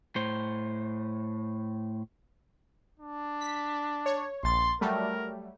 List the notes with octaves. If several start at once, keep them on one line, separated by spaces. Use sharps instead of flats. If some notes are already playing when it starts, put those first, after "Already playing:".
A2 C5
D4
B6
C#5
A#1 C6 A6
F#3 G3 A3 A#4